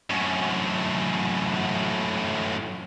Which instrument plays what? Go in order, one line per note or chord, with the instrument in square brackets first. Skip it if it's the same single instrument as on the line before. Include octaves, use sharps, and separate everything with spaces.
[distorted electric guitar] F#2 A2